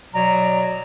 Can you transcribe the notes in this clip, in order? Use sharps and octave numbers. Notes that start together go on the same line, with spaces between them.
B2 F#3 D5 A#5